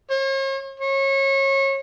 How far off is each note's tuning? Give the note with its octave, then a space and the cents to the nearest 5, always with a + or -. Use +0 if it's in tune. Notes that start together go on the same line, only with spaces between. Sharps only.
C#5 -45
C#5 -30